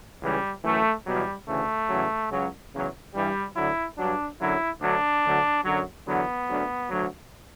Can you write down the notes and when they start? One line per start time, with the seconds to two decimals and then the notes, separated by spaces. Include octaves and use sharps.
0.22 C#2 C#3 E3 G3
0.64 F#2 E3 A3
1.06 E2 B2 F#3 G3
1.47 D2 C#3 E3 A3
1.89 E2 C#3 F#3
2.31 C#2 C#3 F#3
2.73 E2 C#3 F#3
3.14 G2 E3 G3
3.56 D2 D3 F#3 E4
3.98 G2 F#3 D4
4.40 F#2 D3 F#3 E4
4.81 D2 D3 F#3 D4
5.24 D2 D3 F#3
5.65 F#2 D3 F#3
6.06 E2 D3 F#3 B3
6.48 D2 D3 F#3
6.90 D2 D3 F#3